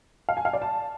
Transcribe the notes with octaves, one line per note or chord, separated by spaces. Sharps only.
F5
G#5
F5
D5
A5